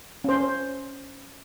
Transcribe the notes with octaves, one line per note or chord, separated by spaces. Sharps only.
C#4 C5